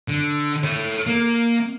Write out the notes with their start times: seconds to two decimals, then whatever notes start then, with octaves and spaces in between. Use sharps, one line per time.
0.08 D3
0.64 A4 C#5
1.06 A#3